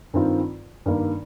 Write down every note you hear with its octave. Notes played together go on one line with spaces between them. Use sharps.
G2 D#3 C4 F4
G2 D#3 A#3